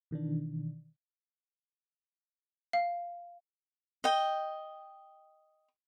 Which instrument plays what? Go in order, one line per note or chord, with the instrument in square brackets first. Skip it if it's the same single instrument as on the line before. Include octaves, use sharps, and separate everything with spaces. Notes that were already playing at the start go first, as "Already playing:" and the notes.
[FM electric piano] B2 D#3 E3 D4
[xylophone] F5
[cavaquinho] D#5 G5